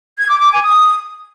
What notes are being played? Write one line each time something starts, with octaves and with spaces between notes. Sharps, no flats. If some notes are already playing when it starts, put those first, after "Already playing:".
G#6
D6
D6
G#5
D#6